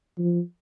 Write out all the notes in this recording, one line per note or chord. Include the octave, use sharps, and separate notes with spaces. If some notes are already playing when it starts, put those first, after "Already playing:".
F3